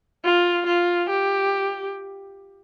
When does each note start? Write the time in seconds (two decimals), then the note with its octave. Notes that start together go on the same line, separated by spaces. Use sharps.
0.25 F4
0.67 F4
1.10 G4